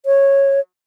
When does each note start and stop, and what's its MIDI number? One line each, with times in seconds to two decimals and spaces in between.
0.06 0.60 73